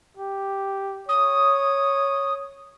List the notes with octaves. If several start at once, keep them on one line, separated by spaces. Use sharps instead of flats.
G4
C#5 D#6